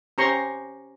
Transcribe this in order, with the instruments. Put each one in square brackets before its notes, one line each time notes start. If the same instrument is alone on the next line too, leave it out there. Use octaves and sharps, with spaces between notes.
[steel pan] C#4 G4 C5 A#5 C6 C#6